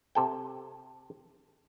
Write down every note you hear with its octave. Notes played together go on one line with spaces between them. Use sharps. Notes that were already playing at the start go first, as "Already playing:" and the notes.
C3 A4 G5